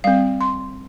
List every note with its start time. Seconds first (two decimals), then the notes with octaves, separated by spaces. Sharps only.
0.04 G3 C4 F5
0.41 C6